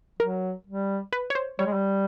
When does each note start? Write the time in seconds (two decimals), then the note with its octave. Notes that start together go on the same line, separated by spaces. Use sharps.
0.19 F#3 A#4
0.67 G3
1.13 B4
1.30 C#5
1.35 C5
1.59 G3 C#5
1.66 G#3
1.74 G3